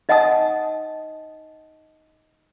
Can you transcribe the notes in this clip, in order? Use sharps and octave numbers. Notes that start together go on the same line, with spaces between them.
D#4 D#5 F#5 G#5 A5 D#6